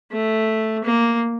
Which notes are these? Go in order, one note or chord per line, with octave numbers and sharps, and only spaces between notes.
A3
A#3